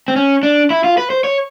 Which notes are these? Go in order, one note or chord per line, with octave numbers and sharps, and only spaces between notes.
C4
C#4
D4
E4
F4
B4
C5
C#5